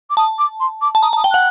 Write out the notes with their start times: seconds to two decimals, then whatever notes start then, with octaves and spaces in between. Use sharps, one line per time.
0.10 D6
0.17 A5 D#6
0.38 D6
0.60 C6
0.81 D6
0.95 A5
1.03 A#5 D#6
1.13 A5
1.17 D#6
1.24 G5
1.31 F#5 F#6